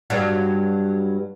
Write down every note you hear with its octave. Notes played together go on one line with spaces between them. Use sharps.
G2 F#3 G3